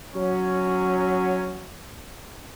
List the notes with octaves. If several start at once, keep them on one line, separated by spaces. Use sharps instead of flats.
F#3 C#4